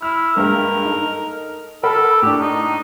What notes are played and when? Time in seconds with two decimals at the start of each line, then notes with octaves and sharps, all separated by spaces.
0.02 E4 F6
0.37 G2 G#3 A#3 A#4
0.85 D#4 A4
1.83 A4 A#4 F#5 B5
2.22 A2 D4 G4
2.40 D#4